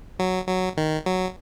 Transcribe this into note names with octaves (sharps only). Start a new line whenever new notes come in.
F#3
F#3
D#3
F#3